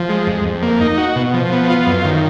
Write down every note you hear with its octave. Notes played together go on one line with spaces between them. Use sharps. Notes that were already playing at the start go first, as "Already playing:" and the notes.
Already playing: F3
G#3
F2
F2
A#3
D#4
F#4
B2
F3
B3
F4
F#2
D#3